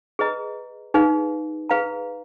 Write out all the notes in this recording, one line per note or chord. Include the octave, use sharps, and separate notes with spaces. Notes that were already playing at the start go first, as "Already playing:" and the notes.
G#4 B4 D#5 A#5
D#4 G#4 B4 F5
G#4 B4 F5 A#5